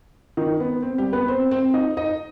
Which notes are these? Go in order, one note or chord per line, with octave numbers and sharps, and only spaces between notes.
D#3 D#4
B3
C4
G3 G4
B3 B4
C4 C5
C4 C5
D#4 D#5
D#4 D#5